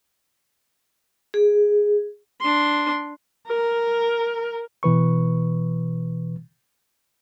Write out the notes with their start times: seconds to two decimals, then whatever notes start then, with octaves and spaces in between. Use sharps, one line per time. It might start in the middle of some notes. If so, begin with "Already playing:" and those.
1.34 G#4
2.41 D4 C6
3.48 A#4
4.83 B2 E3 B4 C#6